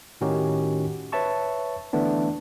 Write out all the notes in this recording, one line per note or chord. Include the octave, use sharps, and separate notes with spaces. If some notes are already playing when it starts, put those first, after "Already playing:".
A2 D#3 C#4 D#4 F#4 G4
B4 C#5 E5 A5 C#6
D3 E3 A3 B3 D4